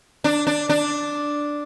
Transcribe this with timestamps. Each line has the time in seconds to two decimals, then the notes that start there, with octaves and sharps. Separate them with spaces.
0.24 D4
0.47 D4
0.69 D4